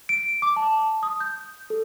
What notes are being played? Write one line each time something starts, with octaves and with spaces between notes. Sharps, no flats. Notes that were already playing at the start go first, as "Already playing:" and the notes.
D7
D6
A5
A5
D#6
G6
A4